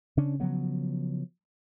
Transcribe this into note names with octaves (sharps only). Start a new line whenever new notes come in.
C#3 C#4 D4
C#3 F3 F#3 B3